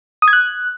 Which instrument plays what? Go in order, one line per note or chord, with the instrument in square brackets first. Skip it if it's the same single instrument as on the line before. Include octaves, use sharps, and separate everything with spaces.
[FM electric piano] D#6
G#6
F#6